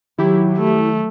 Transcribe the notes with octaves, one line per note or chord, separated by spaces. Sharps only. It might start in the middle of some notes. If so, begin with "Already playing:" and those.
D#3 F#3 E4 G4
A3